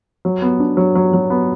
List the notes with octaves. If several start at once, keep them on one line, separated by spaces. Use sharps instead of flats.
F#3
B3
D4
F#3
F#3
F#3
B3